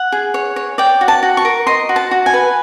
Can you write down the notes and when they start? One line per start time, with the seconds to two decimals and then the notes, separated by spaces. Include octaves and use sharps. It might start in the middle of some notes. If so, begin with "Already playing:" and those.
Already playing: F#5
0.12 G#4
0.34 C#5
0.56 C#5
0.78 D5 G5
1.01 F#4
1.08 A5
1.23 F#4
1.37 C#6
1.45 A#4
1.67 D#5 C6
1.89 F#4
1.96 A5
2.11 F#4
2.26 G#5
2.33 B4